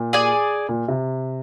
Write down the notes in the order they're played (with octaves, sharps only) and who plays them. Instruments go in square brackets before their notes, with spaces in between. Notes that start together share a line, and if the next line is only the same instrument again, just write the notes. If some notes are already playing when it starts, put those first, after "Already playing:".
Already playing: [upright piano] A#2
[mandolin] G#4 D5 G#5
[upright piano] A#2
C3